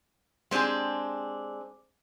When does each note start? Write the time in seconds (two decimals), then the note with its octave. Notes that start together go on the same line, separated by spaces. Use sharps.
0.51 G#3 C4 D4 G4 G#4